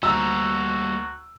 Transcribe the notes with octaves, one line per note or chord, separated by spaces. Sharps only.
D2 G3 A#3 F#4 A#5 E6